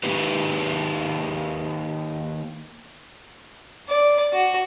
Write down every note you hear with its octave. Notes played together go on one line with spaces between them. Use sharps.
D#3 A#3 D#4 G4 B4
D5
F#4